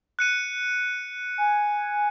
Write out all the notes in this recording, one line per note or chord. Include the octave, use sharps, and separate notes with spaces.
F#6 C#7 D#7
G#5